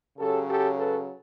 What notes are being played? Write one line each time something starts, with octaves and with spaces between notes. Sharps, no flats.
C#3 F#3 G4 A4
G4 A4
A4 B4